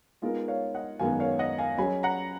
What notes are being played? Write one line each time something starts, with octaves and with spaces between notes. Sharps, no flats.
G#3 B3 D#4 F4 G#4 A#4
C#5 F5
D#5 F#5
F#2 D#3 G#3 B3 F5 G#5
C#5 F5
D#5 F#5
F5 G#5
F#3 C#4 G#4 G#5 B5
F#5 A#5